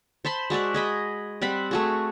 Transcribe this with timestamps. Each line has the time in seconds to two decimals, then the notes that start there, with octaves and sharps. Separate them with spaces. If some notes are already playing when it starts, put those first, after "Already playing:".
0.25 C5 A5 B5 C6
0.50 G#3 F#4 D5 E5
0.74 G#4 D#5 B5
1.41 G3 C4 F#5 B5
1.71 A3 F#4 G#4